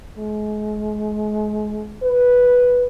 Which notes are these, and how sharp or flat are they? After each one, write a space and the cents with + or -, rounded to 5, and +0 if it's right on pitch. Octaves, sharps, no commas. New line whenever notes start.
G#3 +35
B4 -5